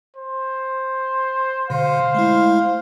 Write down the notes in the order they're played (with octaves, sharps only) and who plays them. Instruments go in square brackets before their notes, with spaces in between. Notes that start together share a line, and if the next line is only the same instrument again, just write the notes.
[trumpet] C5
[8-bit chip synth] B2 D3 [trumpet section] C5 [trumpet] F5
[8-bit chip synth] G#3 A3 E4